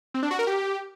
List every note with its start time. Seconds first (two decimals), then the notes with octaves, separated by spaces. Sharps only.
0.14 C4
0.23 D4
0.31 F#4
0.39 A#4
0.47 G4